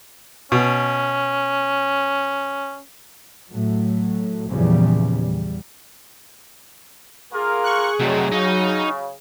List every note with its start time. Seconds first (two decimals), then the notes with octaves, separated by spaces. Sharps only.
0.52 B2 C#4
3.49 A2 F#3 A3
4.49 E2 A#2 C#3 F3 G3
5.18 E2 G3
7.32 A#3 F4 G#4 A#4
7.64 C#6 F#6
8.00 D2 G#2 C3 D#3 F#3 A3
8.32 C#3 D#4 D#5